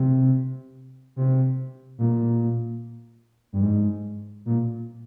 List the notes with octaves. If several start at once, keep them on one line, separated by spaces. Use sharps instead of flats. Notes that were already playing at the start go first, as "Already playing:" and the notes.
Already playing: C3
C3
A#2
G2
G#2
A#2